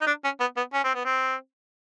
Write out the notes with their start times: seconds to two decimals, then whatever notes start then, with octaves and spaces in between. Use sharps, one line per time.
0.01 D#4
0.07 D4
0.24 C#4
0.40 B3
0.57 B3
0.74 C#4
0.84 C4
0.94 B3
1.05 C4